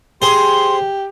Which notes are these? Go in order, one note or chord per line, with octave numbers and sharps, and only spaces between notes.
G4 G#4 C5 C6